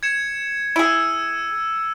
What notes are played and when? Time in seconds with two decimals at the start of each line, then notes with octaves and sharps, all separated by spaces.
0.03 G#6 C#7 E7
0.76 E4 G#4 E6 D#7